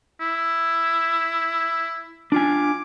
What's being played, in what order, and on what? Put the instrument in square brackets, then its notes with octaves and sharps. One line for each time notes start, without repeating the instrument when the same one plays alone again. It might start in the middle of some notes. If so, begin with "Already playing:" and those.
[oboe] E4
[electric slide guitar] D4 F4 G#5 [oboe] D6